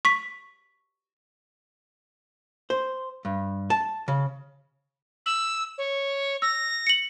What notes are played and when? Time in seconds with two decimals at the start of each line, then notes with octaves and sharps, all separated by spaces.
0.05 C#6 B6
2.70 C5
3.25 G2
3.70 A5
4.08 C#3
5.26 E6 F#7
5.78 C#5
6.42 E6 A#6
6.87 C#7 F#7